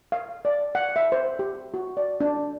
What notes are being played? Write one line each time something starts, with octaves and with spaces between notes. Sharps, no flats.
F5
D5
F#5
E5
C5
G4
F#4
D5
D4